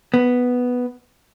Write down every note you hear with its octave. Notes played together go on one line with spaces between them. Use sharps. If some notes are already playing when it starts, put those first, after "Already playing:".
B3